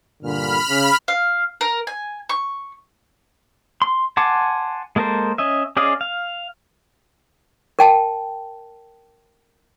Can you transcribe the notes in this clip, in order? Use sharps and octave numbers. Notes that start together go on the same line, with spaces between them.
G2 A#2 D3 B5 F6
C#3
F5
A#4
G#5
C#6
C6
F#5 G#5 A5 C6 D6
G#3 A#3 A4 A#4 C5
C#4 D#5 E5
C#4 G#4 D5 D#5 F5
F5
A#4 G5 A5